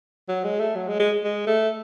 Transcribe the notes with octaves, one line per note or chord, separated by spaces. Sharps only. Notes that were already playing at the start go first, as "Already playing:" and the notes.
F#3
G#3
A3
F#3
G#3
G#3
G#3
A3